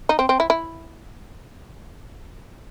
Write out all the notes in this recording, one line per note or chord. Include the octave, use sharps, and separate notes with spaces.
D#4
C4
C4
E4
E4